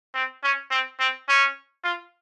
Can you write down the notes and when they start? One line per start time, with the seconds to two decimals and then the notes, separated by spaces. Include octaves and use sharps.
0.14 C4
0.44 C#4
0.71 C4
1.00 C4
1.29 C#4
1.84 F4